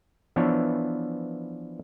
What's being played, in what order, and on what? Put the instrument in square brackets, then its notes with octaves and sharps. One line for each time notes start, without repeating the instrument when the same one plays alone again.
[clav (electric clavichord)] E3 F3 B3 D4 C#5 E5